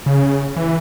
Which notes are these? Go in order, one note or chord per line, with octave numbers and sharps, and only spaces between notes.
C#3
E3